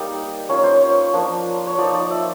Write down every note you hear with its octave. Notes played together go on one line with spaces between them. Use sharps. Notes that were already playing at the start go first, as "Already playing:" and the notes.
Already playing: G3 A#3 D#4 D5
A#3 C#4 F4 C#5
C5
C#5
F3 A#3 D4
C#5
F3 A#3 D#4 D5
D5
E5